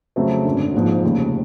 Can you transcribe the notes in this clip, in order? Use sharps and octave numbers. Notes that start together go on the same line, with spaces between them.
F2 C#3 F#3 A3 C4
G#1 F#2 D3
A#1 G#2 F3
F1 D#2 C#3